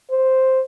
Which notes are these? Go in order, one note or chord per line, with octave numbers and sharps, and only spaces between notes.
C5